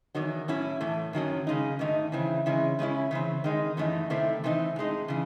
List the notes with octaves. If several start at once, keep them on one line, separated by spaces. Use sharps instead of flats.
E2 D#3 F#3
A2 F#3 C#4 E4
A2 E3 A3
F#2 D#3 F#3 C#4
C#3 G#3 D#4
G#2 D#3 A3 D#4
C#3 E3 C4 E4
C#3 E3 G#3 C#4 E4
C#3 G#3 C#4 E4
C#3 E3 C4
D#3 G#3 D#4
F#2 E3 A3 D#4
C3 D#3 A3 C4 E4
C3 E3 C4 D#4
A2 G#3 D#4
C#3 E3